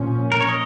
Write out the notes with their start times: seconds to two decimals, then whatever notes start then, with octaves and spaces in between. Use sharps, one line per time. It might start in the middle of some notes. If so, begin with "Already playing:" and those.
Already playing: A#2 F3 C#4
0.32 A#4
0.41 C#5
0.49 D#5